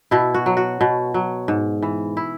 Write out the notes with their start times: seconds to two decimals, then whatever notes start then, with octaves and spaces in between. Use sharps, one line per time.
0.11 B2 E4
0.34 F#4
0.46 F#3
0.57 F#4
0.81 B2
1.14 F#3
1.48 G#2
1.82 E3
2.17 E4